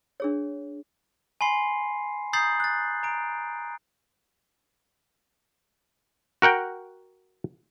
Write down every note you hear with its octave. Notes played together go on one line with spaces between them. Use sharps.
D4 G#4 C#5
G#5 B5 C6 C7
A#5 D#6 G6 A6 C7 F#7
F#6 A6
A#5 D7
F#4 A#4 F#5 G5